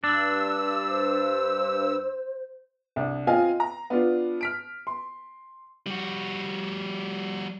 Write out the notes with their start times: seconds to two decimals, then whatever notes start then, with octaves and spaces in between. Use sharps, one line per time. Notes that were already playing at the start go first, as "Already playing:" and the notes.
0.04 G2 D4 E6
0.88 C5
2.96 C2 D4
3.27 C4 F4 D#5 F5 G#5
3.60 A#5
3.90 B3 D4 F4
4.41 F6 B6 D7
4.87 C6
5.87 G3 F#4